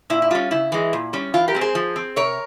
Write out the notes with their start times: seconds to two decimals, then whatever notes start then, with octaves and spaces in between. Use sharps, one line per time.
0.10 A#2 E4
0.22 E4
0.31 G3 C#4 F4
0.51 C#3 E4
0.72 E3 G#3
0.93 A#2
1.13 G3 C#4
1.34 E3 F4
1.48 G4 A#4
1.55 G#3 C4
1.61 G#4 C5
1.75 F3
1.96 C4
2.16 C3 A#4 C#5